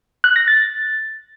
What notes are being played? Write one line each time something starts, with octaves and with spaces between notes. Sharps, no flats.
F#6
A#6
A6